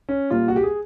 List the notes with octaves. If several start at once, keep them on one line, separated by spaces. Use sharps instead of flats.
C#4
A#2 G3 A#3 F4
F#4
G4
G#4